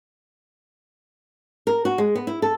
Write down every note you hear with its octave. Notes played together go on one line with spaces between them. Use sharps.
A#4
F#4
G#3
B3
E4
A4